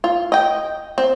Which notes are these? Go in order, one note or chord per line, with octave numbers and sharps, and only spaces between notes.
F4
D#5 G5
C4